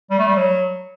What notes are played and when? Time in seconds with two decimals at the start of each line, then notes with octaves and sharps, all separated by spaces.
0.10 G3
0.19 A3
0.28 G3
0.36 F#3